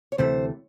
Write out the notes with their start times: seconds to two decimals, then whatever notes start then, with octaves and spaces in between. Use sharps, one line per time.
0.12 C#5
0.18 D2 C3 E3 A3 C5